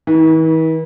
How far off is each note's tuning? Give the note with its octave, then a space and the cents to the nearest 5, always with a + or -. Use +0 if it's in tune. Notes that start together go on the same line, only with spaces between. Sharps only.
E3 -45